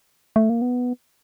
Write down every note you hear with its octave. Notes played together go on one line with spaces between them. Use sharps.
A3
A#3
B3